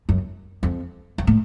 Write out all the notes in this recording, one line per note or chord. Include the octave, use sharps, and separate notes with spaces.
F#2
F2
F#2
A2